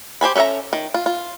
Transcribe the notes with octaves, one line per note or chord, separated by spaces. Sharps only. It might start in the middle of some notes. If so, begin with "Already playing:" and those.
G4 C5 G#5 B5
C#4 A4 B4 E5 A#5
D#3
F4
F4